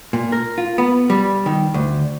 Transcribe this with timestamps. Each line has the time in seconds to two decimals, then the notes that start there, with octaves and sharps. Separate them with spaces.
0.13 A#2
0.32 A#4
0.58 F4
0.78 B3
1.10 G3
1.46 D#3
1.74 D2